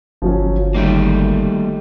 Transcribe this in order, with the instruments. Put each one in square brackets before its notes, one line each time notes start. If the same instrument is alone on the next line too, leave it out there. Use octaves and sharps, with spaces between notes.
[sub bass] G1 [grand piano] F3 F#3 C#4
[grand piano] D#3 [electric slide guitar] G3 A3 A#3